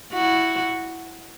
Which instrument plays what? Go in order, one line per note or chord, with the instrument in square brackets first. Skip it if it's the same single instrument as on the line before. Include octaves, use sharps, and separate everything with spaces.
[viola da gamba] E4 F#4